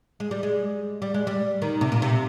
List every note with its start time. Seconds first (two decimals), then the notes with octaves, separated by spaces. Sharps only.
0.20 G#3
0.31 G3
0.43 G#3
1.02 G3
1.14 G#3
1.27 G3
1.62 D#3
1.81 C3
1.92 A#2
2.02 C3